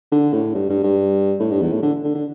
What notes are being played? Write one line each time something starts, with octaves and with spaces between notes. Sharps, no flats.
D3
A2
G2
G2
G2
A2
G2
E2
A2
D3
D3
D3